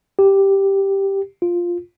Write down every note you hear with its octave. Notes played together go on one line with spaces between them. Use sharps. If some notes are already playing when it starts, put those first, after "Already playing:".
G4
F4